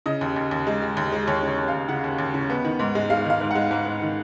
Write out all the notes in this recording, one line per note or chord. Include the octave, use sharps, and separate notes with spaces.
C#3 D#5
D#2
D#2
D#2
G#3
G#3
D#2
G#3
D#2 C#5
C#3
C#5
D#2
F5
D#2
C#3 F#5
D#2
D#2
C#3
B3
D#3
G#2
G#3
G#3 F5
D#3 F5
G#2
G#3 F#5
G#2
G#2
D#3